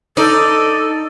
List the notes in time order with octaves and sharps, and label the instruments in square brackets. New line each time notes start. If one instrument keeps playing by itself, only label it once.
[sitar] D#4 [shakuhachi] A4 [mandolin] D5